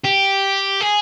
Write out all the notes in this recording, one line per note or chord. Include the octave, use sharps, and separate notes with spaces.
G4
G#4